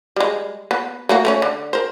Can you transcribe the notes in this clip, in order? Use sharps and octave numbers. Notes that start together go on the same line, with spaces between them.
G3 G#3
B3
A3 A#3 F#4
A3 C#4 C#5
D3
A#4 C5